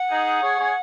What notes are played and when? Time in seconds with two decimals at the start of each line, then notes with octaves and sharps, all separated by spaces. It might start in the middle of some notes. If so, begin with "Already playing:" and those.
Already playing: F#5
0.10 D#4 G#4
0.43 G#4 C#5
0.59 G#4 C#5